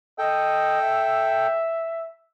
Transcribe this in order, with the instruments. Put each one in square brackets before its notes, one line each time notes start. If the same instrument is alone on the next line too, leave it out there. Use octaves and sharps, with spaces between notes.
[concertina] A4 G5 [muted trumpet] D#5
[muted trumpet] E5